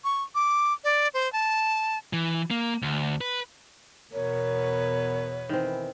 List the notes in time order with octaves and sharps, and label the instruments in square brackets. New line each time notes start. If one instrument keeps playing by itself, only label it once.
[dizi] C#6
D6
D5
C5
A5
[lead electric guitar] E3
A#3
D2
B4
[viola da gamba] E2 B2 B4 [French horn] A#4 [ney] C#5
[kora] D#3 C4 [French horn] E3